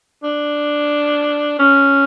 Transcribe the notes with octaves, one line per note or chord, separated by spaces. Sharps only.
D4
C#4